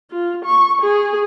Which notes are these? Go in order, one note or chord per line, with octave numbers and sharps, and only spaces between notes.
F4
C#6
G#4